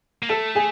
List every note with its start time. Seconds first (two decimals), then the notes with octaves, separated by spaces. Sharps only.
0.23 A#3
0.29 A3 A4 A5
0.55 G#4 G#5